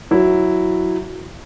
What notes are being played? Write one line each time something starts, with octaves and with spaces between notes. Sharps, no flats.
F#3 E4